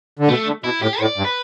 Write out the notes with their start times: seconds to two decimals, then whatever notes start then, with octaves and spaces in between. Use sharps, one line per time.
0.19 D3
0.29 B2 A3
0.46 D3
0.64 B2 E4
0.82 A2 G4
1.00 A2 D5
1.17 G2
1.24 B4